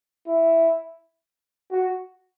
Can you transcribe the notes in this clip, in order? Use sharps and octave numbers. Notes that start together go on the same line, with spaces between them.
E4
F#4